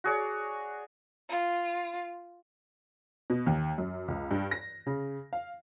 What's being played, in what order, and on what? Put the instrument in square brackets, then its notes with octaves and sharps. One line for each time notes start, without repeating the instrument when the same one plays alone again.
[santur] F#4 G#4 C#5 D5
[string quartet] F4
[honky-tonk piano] B2
D#2
F#2
C#2
G2
A#6
C#3
F5